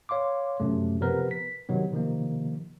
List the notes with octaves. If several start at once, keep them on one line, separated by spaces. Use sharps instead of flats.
C#5 F5 C6 D6
F#2 C3 A3
C3 F3 B3 A#4 B4
B6
C3 D#3 F#3 B3
C3 D#3 F3 A#3